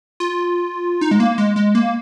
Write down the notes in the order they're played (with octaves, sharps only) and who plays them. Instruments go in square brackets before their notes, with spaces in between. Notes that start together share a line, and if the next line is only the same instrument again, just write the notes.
[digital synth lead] F4
D#4
G#3
A#3
G#3
G#3
A#3